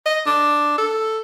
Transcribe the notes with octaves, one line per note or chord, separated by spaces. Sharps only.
D#5
D4
A4